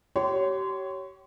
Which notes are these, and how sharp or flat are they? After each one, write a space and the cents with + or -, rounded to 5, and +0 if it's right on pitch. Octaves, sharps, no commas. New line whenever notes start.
G4 -35 C#5 +0 C6 -25